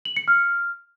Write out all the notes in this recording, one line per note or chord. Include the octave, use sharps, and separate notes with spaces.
F#7
C#7
F6